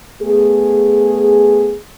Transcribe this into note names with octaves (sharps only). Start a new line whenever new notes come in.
A3 B3 G#4